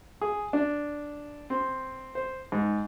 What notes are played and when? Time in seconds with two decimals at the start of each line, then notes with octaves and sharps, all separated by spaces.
0.21 G#4
0.53 D4
1.50 C4
2.15 C5
2.52 G#2